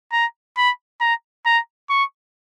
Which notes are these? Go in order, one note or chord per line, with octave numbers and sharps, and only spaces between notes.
A#5
B5
A#5
A#5
C#6